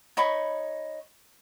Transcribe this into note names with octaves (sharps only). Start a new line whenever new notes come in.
D#4 C#5 B5 C#6